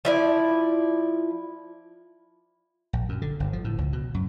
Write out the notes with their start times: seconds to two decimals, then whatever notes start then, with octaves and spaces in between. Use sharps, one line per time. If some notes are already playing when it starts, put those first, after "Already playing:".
0.05 F3 E4 D5
2.93 A#1
3.09 F#2
3.22 D3
3.40 G1
3.53 F3
3.64 A2
3.78 C#2
3.93 B2
4.14 F#2